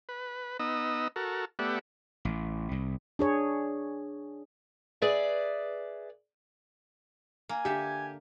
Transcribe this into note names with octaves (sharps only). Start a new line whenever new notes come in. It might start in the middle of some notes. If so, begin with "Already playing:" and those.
B4
B3 D#4 D#5 E6
F#4 A4 A#4
A3 B3 G4 D5 E5 F#5
A1
C2
D4 G#4 C#5
G#4 B4 D5 E5
A#3 G#5
D3 G4 E5